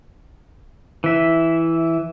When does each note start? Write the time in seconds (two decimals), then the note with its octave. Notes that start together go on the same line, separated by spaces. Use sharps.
1.04 E3 E5